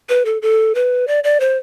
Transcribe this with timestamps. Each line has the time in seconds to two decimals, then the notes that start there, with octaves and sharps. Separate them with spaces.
0.09 B4
0.25 A4
0.42 A4
0.75 B4
1.08 D5
1.24 D5
1.40 C5